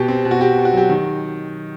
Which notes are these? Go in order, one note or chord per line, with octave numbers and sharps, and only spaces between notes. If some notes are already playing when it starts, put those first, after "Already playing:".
Already playing: B2 G4
C4
B2
F#4
B2 G4
B2
F#4
F#3 G4
D#3